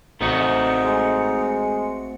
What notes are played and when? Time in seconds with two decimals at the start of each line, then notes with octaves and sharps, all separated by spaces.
0.21 A1 A3 C4 D#4 F#4 C#7
0.85 G#3